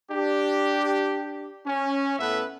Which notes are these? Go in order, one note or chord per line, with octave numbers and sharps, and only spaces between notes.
D4 G4
C#4
A2 B3 A4 B4 E5